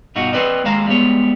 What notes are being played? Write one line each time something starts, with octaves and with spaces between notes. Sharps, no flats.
G2 B2 D#4 F4 F#4
C4 B4 D5 D#5
D#2 G#3 C5 F5 A#5
G3 G#3 B3 C#5